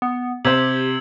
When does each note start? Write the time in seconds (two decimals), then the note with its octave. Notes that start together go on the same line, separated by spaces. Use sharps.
0.02 B3
0.45 C3 G4 C5 E6 G#6 F#7